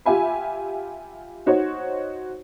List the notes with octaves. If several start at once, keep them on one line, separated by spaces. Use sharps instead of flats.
F4 G4 E5 G#5 B5
D#4 F#4 C5 C#5